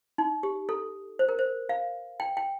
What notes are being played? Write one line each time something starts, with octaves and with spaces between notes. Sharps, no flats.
D#4
G4
A4
C5
A#4
C5
F5
G5
G5